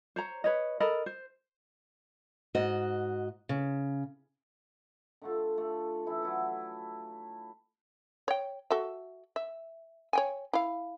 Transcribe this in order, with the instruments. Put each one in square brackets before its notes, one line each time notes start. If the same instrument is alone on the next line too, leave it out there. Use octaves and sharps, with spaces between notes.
[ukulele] C5 C#5 A#5
B4 C#5 D#5
A4 A#4 D#5 B5
C5
[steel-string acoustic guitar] G#2 F#4 D#5
C#3
[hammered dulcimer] D3 A3 F4
A3
E3 A3 E4
F#3 E4 A4
[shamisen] C#5 G5
F#4 A4 E5
E5
C#5 G5 G#5
E4 F5